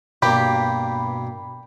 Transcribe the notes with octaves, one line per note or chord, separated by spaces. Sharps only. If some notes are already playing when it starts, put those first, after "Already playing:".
G2 B2 A#3 G4 B5